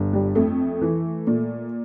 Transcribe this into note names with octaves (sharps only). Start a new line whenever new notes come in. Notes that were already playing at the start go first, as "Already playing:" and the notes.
Already playing: G1
G3
F2 A3
E3
A#2